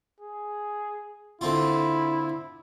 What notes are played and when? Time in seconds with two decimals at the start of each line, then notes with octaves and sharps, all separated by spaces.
0.21 G#4
1.41 D3 C4 E4 F4